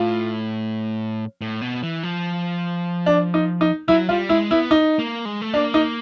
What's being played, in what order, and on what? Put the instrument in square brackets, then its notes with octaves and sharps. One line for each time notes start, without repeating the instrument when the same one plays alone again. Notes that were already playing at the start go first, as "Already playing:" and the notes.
Already playing: [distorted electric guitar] A2 [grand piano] F4
[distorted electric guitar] A2
B2
E3
F3
[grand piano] D4
D#4
D#4
[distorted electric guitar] F#3 [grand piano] E4
[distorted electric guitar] G3 [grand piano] F4
[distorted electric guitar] G#3 [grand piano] E4
[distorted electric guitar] B3 [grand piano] E4
[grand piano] D#4
[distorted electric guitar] A#3
G#3
A3
[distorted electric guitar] A#3 [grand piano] D4
[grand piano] D#4